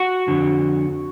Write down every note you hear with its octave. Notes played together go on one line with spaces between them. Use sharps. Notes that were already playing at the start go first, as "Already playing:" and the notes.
Already playing: F#4 F#5
F2 D3